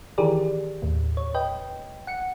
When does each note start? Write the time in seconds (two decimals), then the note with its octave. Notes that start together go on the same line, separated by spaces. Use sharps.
0.18 D#3 E3 G4 G#4 A#4 D5
0.82 D#2 A2
1.17 C#5
1.34 B4 D#5 G5
2.07 F#5 C#7